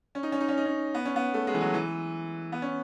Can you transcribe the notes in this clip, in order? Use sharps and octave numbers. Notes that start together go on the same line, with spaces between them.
C#4
D#4
C#4
D#4
C#4
D#4
C#4
B3
C#4
B3
A3
G#3
E3
F#3
E3
B3
C#4